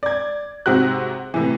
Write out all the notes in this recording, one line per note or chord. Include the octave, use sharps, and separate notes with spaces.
D5 G#6
G#2 C3 C4 F#4 F#6
A2 C3 E3